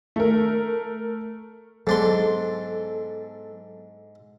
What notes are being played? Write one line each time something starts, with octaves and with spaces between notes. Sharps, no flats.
A3 A#4
G#2 F#3 B3 D4 A4 C6